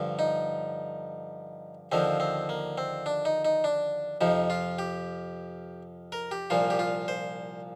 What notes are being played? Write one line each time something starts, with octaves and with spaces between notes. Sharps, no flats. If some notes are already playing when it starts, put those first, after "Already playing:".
Already playing: G2 D3 F3
D#4
D#2 D3 F3 C4
C4
A#3
C4
D4
D#4
D#4
D4
F2 C3 F3 D#4
F4
G4
A#4
G4
C2 A#2 F3 F4
G4
F4
C5